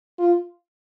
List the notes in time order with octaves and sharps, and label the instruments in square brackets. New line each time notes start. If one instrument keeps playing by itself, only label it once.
[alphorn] F4